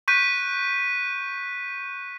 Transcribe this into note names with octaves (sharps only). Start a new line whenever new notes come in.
C#6 F#6 G6 B6 D#7